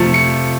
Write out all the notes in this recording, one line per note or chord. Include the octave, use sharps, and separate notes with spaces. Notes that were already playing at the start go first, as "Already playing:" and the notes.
Already playing: F2 C3 F3 A3 C#7
C#7